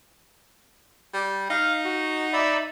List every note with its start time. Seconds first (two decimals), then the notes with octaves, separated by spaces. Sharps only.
1.14 G3
1.50 D#4 F5
1.85 F#4
2.33 D5 E5 B5